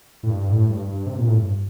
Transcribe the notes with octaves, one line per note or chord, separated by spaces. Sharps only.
A2
G2
A2
G2
G2
C3
A#2
A2
G2